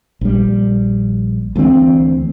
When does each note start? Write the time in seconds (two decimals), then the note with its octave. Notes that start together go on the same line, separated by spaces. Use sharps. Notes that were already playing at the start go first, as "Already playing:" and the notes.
0.21 A#1 G3
1.56 D2 E3 A#3 C4